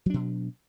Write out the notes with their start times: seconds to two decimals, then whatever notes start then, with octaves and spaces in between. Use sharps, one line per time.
0.06 F#3
0.10 D4
0.14 B2